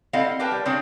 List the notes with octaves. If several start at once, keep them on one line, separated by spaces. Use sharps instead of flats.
C4 E4 A4 D#5 F5 F#5
G4 A#4 B4 G5 A5
G3
C#3 C4 D4 C#5 G5